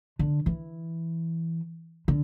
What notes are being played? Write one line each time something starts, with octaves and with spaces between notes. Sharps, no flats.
D3
E3
D3